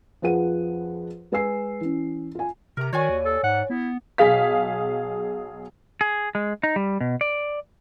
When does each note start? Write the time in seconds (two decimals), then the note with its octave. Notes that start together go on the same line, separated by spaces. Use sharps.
0.22 F2 F3 G#4 B4 F#5 D#7
1.32 G#3 B4 G#5 E6 C7
1.81 E3 C#4
2.35 F4 G#5
2.77 C3 A#4 A#5
2.93 D#3 F#4 C#5 D5 G#5
3.09 D#2
3.25 A4
3.43 G#2 F#5
3.70 B3 E4
4.18 B1 G#4 F5 B6
6.01 G#4
6.35 G#3
6.63 D#4
6.76 G3
7.01 B2
7.21 D5